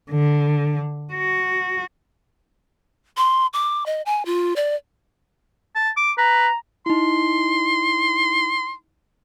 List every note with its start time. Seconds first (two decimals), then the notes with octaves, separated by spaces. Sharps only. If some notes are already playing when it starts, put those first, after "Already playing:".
0.11 D3
1.14 F#4
3.17 C6
3.53 D6
3.86 D#5
4.06 G#5
4.26 F4
4.56 D5
5.75 A5
5.97 D6
6.18 B4 A#5
6.86 D#4 E4 C6